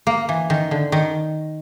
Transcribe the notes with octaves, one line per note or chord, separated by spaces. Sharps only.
A#3
E3
D#3
D3
D#3